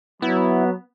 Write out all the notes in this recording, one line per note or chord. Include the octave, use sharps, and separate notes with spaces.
F#3 B3 E4